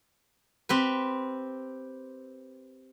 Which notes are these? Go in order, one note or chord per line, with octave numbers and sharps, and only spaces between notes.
C4 G4 B4